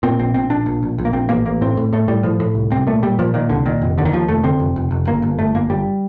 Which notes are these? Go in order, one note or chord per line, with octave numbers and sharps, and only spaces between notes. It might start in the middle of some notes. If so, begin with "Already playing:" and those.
A#2 C4
A#1 C4
A#1 C4
A#1 D4
A#1
A#1
A#1
A#3
A#1 C4
A1 A#3
A1 A#3
A2 C4
A2
A2 A3
A2 G3
A2 F3
A2
C2
C2 C4
A#2 A3
A#2 G3
A#2 F3
A#2 D#3
C2 D3
A#2 D#3
F1
D#2 D3
D#3
D#2 F3
F1 A3
D3 C4
F1
F1
F1
G1 A#3
G1
G1 A3
G1 A#3
G1 G3